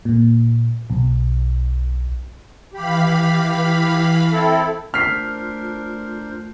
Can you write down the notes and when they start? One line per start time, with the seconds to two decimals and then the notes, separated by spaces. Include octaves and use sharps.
0.05 A#2
0.90 B1
2.73 E3 G4 F5 B5
4.32 C4 E4 A4
4.94 A3 D4 F4 A#4 C5 F6 B6 C7